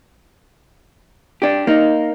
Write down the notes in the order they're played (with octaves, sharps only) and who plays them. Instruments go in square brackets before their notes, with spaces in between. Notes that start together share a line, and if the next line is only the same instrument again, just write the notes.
[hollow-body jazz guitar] D4 G4
A#3 D#4